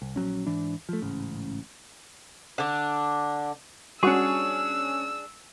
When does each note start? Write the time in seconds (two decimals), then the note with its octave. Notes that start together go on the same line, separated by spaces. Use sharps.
0.02 C2
0.16 A#1 G2 F#3 C#4
0.47 G#2 E3 D4
0.89 F3 A3
1.02 A1 G#2 C#3
2.58 D3 D4
4.03 G3 C#4 D4 F#4 G#4 F#5 C#6 E6